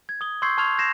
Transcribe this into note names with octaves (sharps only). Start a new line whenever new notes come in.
G#6
D#6 G7
C6 C#6 E6 G6 G#6 C7
A5 C6 C#6 F6 G#6 F7
G6 G#6 A#6 C7 E7